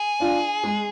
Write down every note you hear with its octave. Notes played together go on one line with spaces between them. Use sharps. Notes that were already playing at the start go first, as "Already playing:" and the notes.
Already playing: G#4
D4 F4
G#3